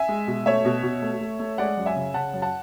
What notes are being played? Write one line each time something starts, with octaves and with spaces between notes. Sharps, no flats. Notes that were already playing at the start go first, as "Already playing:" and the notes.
Already playing: E5 G#5
G#3
B2
A3 C#5 E5
B2
B2
A3
A3
A3
G#3 D5 F#5
F#2
E5 G#5
C#3
C#3 F#5 A5
F#2
F#5 A5